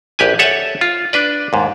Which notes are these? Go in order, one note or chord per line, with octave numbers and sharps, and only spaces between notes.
A#1 G4 B4 G#5
A4 C#5 E5 F#5 G#5 A5
F4
D4 B4 D5
D#2 G#2